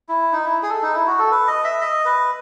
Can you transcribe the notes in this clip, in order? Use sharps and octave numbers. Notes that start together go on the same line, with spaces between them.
E4
D#4
E4
G#4
A4
D#4
E4
F#4
A4
B4
D#5
E5
D#5
B4